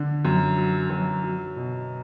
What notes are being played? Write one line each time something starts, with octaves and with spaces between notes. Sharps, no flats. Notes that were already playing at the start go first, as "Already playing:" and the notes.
Already playing: D3
F#2
F#3
F#2
F#3
B2